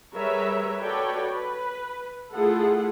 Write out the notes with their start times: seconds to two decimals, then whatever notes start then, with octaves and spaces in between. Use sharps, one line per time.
0.15 G3 G#4 A#4 B4 C#5 E5
0.80 F#4 A4 B4 C#5 D5 G5
1.31 B4
2.33 A3 E4 F4 G#4 A4 F#5